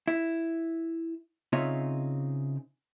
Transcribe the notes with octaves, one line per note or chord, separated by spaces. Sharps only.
E4
C#3 C4 D#4 F4 C#5 E5